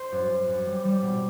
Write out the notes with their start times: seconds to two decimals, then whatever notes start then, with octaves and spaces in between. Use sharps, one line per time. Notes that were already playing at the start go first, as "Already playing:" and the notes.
Already playing: C5
0.12 F#2
0.30 F#2
0.47 F#2
0.66 G3
0.85 G3
1.02 B2